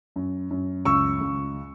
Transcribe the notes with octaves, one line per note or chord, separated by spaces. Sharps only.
F#2
F#2
C#2 C#6 E6
C#2